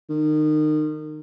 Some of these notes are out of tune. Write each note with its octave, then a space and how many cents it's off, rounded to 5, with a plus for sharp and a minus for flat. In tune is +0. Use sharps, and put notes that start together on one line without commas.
D#3 -30